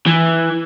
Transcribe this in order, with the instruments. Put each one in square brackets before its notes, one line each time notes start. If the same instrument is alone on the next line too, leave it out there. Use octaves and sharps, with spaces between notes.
[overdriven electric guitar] E3